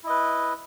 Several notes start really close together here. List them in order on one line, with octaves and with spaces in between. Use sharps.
E4 D#5 B4